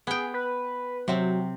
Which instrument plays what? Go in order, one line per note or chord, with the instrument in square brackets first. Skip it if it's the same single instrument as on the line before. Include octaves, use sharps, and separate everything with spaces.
[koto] B3 G5 [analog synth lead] G#4
[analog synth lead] B4
[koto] C3 C4 [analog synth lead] F#3